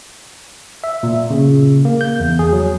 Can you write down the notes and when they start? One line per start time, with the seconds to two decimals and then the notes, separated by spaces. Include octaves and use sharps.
0.84 E5
1.03 A#2
1.30 C#3
1.85 A#3
2.01 G6
2.20 E2
2.39 G#4
2.53 F#3